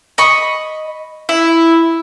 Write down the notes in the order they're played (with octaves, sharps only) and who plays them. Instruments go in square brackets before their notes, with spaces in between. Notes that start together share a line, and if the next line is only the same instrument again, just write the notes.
[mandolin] D#5 B5 C#6
[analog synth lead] E4 [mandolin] E5